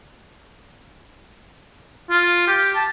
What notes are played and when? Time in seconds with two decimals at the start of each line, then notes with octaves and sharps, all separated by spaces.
2.10 F4
2.48 G4
2.76 A5